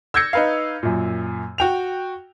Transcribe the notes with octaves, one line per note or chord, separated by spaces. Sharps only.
E6 G6 G#6 A#6 C#7
D#4 B4 F5
F#2 A#2
F#4 G5 F7